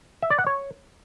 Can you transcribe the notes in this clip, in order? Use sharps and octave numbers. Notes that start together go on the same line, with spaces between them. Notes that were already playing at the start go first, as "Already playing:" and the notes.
E5
D5
F#5
C#5